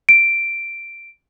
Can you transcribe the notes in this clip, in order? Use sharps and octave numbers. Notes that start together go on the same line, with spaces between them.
D7